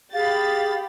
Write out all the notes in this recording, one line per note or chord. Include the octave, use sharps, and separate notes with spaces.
G4 G#4 F5 B5 A6